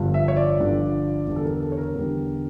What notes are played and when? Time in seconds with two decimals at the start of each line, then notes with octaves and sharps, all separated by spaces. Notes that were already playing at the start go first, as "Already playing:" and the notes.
Already playing: G1 G2 D3 F3
0.14 E5
0.28 C#5
0.37 D5
0.59 G1 G2 D3 F3
1.26 E2 D3 G3
1.36 A4
1.43 A#4
1.60 A4
1.72 C#5
1.77 A#4
1.94 E2 D3 G3